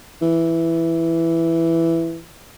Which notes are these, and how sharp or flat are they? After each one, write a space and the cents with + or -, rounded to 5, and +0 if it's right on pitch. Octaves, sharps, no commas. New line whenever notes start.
E3 +5